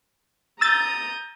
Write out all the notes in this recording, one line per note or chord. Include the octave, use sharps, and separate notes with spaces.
A#5 D#6 E6 G6 A6